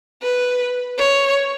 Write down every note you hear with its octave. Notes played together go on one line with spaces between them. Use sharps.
B4
C#5